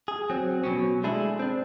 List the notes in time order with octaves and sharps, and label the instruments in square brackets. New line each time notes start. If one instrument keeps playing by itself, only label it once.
[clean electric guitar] G#4
F#3 C4
B2 F#3 C#4
G#3 A3 D4 E4 G#4
C4 D4